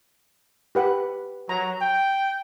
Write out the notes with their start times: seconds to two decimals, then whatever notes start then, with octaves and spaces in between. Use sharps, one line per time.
0.75 G4 B4 F#5
1.49 F#3 A#5
1.82 G5